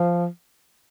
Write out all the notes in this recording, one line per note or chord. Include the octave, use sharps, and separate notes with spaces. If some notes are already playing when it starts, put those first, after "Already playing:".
Already playing: F3